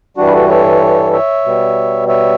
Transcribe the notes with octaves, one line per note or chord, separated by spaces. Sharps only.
G2 E3 G3 D4 F#4
B4
F#4 A4
A4 C#5
C#5 E5
B2 G3
C#5 E5